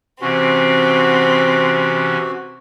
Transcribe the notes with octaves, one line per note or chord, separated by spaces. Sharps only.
C3 E3 C4 C#4 F#4